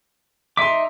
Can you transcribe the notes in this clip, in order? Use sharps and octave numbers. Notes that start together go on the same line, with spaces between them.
D#4 E5 C6 D6 B6